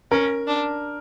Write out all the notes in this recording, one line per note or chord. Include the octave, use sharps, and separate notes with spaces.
C#4 A#4
D4